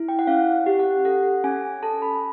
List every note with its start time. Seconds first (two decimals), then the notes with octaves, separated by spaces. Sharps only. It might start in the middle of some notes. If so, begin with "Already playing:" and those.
Already playing: E4
0.08 G5
0.19 F#5
0.27 C#4 F5
0.66 G4
0.79 F#5
1.05 A4 F#5
1.44 C#4 G#5
1.83 A4 A5
2.02 B5